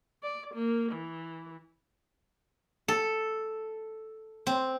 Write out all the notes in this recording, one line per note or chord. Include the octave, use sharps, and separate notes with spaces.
D5
A#3
E3
A4
C4